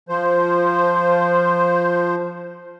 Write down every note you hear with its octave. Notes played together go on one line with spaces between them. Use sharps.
F3 C5